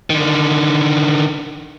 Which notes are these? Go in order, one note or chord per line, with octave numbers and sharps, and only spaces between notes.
D3 D#3